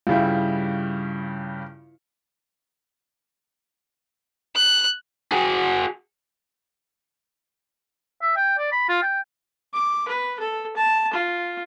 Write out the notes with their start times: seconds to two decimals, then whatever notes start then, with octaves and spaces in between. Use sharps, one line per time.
0.07 G2 C#3 G3 E4 F4
4.56 F#6
5.32 F#4 G#4
8.22 E5
8.37 G5
8.58 D5
8.72 B5
8.89 F4
9.02 G5
9.73 D6
10.08 B4
10.39 A4
10.76 A5
11.13 F4